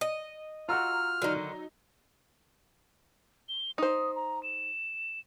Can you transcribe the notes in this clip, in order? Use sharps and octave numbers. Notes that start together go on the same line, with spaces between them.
D#5
F4 F#4 F#5 A#5 E6 F6
D3 D#3 F#3 D#4
G7
D#4 C5 D#6
A#5
E7